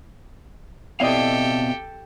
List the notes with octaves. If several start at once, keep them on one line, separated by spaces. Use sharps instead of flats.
B2 C4 E4 G4 A4 D5 D#5 F5